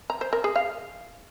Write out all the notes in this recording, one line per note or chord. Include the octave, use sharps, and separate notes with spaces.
A#5
C5
A#4
G#4
F5